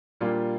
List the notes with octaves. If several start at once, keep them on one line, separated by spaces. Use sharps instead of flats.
A#2 G3 A#3 D4 F4